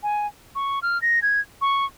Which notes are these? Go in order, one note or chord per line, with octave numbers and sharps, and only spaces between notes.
G#5
C#6
F6
A#6
G#6
C#6